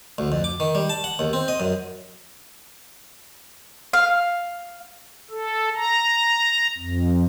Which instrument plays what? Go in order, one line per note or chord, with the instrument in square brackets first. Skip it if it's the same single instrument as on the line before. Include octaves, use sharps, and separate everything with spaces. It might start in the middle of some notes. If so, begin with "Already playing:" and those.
[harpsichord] D2
F2
D6
D#3
G3
A5
F#5
D#2
C4
D#5
F#2
[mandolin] F5
[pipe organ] A4
A#5
F2